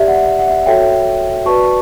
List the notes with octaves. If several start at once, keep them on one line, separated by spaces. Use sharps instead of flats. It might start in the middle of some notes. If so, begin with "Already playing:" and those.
Already playing: G4 D5 E5
F#5
F#5
E5
F#4 A4 C#5 E5 G5
F#4 B4 D5 A5 C#6